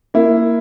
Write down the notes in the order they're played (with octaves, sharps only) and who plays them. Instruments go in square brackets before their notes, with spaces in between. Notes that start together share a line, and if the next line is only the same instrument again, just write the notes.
[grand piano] A#3 E4